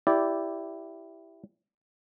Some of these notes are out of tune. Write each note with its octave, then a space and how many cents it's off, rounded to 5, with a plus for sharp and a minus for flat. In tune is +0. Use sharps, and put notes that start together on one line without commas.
E4 +0 G4 +0 D5 -10